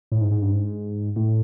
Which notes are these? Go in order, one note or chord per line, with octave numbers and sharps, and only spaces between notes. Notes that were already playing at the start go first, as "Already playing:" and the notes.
A2
G#2
G#2
G2
G#2
A2